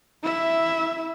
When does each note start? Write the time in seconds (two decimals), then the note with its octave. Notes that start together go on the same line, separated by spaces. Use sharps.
0.24 E4 E5